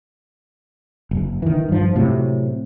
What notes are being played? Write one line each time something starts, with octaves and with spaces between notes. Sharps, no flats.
F#1
D#3 E3
G2 F3
A2 C3 F#3